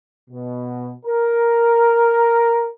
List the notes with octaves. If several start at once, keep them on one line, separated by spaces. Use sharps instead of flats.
B2
A#4